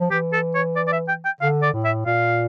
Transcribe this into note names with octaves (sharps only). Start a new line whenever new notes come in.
F3
E3 G4
A4
C#5
D5
D5
E5
G5
G5
D3 F5
D5
A2
E5
A#2 F5